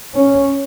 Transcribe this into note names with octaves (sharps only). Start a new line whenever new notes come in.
C#4